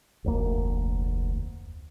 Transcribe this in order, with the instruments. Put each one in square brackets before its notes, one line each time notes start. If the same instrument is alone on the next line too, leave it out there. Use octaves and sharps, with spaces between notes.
[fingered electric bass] F1 D2 A#3